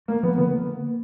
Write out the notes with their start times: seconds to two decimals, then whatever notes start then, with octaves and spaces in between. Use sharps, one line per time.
0.08 A3 A#3
0.23 F3 B3
0.38 D3 B3
0.53 A#3